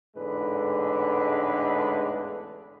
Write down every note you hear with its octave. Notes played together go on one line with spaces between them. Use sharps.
A1 E2 G#2 D3 G#3 B4